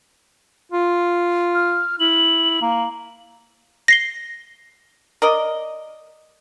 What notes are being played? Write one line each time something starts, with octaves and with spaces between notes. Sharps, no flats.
F4
F6
E4 F#7
A#3
A#6 C7 G7
A#4 D5 D#5